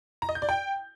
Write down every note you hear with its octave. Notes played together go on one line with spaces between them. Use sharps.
A#5
D#5
G6
D5
G5